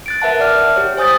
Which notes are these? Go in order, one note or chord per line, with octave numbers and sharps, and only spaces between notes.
F#6 A6 D7
A#4 B4 E5 F#5 A5
D5 F#5 F6
G4 C#5
C5 G#5 D#6 G6 A6